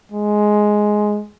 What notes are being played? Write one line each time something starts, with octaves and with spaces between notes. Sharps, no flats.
G#3